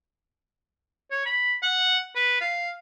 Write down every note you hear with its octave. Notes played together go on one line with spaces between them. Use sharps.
C#5
B5
F#5
B4
F5